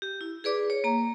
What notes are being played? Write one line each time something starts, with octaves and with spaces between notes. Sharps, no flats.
G4
E4
G#4 B4 D5 D6
C#5
A#3 A#5